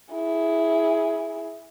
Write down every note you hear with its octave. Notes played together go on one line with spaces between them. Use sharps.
E4 G#4